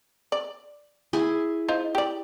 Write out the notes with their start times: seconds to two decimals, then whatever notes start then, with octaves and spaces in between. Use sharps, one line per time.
0.32 D5
1.13 E4 G#4
1.68 D#4 F4 C5
1.95 G4 D5